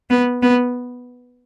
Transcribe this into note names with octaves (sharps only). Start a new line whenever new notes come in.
B3
B3